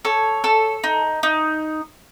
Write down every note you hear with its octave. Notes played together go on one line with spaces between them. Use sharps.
A4 C#5
A4
D#4
D#4